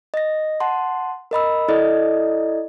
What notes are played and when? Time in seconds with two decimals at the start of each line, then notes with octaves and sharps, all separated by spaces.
0.14 D#5 A#6
0.60 F#5 A5 C6
1.31 A#4 D#5 B5 E6
1.68 E4 A4 D5 D#5